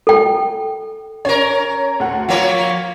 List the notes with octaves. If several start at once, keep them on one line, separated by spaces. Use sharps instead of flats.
A4 G5
C#4 A#4 C#5
D2 F#4 F#5
F3 A#3 F4 C#5